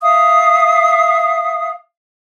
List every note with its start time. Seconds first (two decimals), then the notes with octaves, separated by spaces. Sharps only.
0.03 E5 F5 D#6